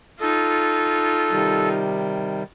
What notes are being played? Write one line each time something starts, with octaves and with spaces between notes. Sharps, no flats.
D#4 F4 A4
C3 D#3 G3